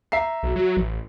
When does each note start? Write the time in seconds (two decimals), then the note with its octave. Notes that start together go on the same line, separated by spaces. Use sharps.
0.12 E5 A#5 C7
0.43 B1
0.56 F#3
0.77 A1